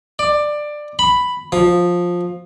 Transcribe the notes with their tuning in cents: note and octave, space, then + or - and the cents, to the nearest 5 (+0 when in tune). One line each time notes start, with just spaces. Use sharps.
D5 +15
B5 +5
F3 +10